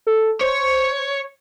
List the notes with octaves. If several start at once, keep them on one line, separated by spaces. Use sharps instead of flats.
A4
C5 C#5